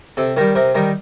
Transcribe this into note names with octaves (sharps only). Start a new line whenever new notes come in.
C3 A4
D#3 G3 A#4
C3 A#4
D#3 G3 A#4